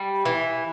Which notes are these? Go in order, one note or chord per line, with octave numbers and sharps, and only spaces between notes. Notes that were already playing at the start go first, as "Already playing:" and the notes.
Already playing: G3
E3